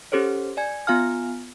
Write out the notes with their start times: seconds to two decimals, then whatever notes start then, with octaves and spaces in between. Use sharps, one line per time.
0.12 C#4 G4 A4 C5 C#5
0.57 D5 G#5 G#6
0.87 B3 F4 F5 G#5 F6